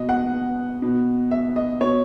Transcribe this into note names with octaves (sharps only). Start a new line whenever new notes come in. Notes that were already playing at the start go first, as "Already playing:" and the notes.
Already playing: B2 D#5
F#5
B2
E5
D#5
B2 C#5